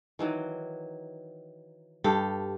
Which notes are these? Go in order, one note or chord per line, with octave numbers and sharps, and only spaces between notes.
D#3 E3 F#3
G2 G4 A4 F5